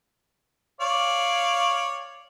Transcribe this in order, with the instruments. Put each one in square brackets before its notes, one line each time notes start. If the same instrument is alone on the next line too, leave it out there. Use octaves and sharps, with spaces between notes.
[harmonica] C#5 D5 F5